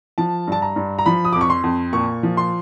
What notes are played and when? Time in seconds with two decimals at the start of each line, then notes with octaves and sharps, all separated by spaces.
0.18 F3 A5
0.47 G2 A5
0.62 A#5
0.76 G2
0.99 A#5
1.06 F3 B5
1.25 D#6
1.33 F2 D6
1.41 C#6
1.50 C6
1.64 F2
1.93 A#2 C#6
2.23 F3
2.37 C6